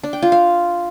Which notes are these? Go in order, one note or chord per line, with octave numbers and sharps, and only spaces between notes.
D4
G5
F4
F5